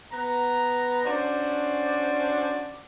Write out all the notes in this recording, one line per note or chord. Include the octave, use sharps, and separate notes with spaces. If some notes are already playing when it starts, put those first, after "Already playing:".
B3 A#5
C#4 D4 F#4 C5 D5